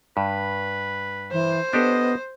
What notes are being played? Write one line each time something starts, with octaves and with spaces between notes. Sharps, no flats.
G2 B4
E3 C5
B3 D4 G4 A4 D#5